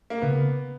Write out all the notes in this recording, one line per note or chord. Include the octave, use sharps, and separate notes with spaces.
A#3
C#3 B3